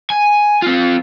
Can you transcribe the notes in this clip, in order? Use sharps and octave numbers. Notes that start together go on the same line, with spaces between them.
G#5
C4 F4